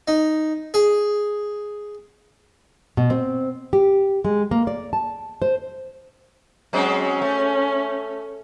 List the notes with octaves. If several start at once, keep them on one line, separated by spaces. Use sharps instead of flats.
D#4
G#4
B2
C4
G4
G#3
A#3
D5
A5
C5
F#3 G#3 C4 C#4
A3